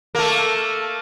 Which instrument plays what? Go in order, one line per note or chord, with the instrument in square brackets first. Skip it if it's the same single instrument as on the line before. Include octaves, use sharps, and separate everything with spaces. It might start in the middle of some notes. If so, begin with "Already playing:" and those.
[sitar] A3 A#3